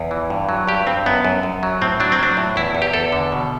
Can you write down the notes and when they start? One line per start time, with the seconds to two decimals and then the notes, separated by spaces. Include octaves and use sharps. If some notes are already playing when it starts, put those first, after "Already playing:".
Already playing: E2
0.11 E3
0.30 G2
0.49 F#3
0.67 G2 G4
0.87 G2 C4
1.06 F#2 B3
1.25 F#2
1.43 F#2
1.63 F#3
1.81 A2 C4
2.00 F#3 D4
2.12 C4
2.19 F#3 D4
2.37 A2
2.56 E2 E4
2.75 E2
2.82 G4
2.93 E2 A4
3.12 D3
3.32 B2